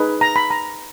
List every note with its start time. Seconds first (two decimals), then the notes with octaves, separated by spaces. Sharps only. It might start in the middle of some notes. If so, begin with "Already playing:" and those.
Already playing: D#4 G#4 B4
0.21 A#5
0.36 B5
0.51 A#5